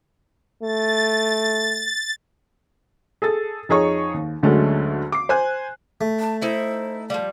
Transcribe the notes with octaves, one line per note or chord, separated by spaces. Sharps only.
A3 A6
G#4 A4 A6
F2 D#4 G#4 C#5 C#6
D#2
D2 D3 F#3 G#3 A3 C#4
D6 C7
C5 G#5 F#6
A3
A5
D#4 E4 C5 E5
F3 G3 F5